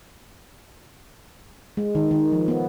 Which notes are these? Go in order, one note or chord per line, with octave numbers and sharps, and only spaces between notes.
G#3
D#3
D#3
F3
B3